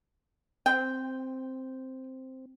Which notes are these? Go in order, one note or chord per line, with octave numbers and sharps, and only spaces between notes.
C4 G5